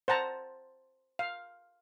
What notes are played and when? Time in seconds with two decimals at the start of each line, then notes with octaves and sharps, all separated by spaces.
0.08 C5 F#5 A5 A#5
1.19 F5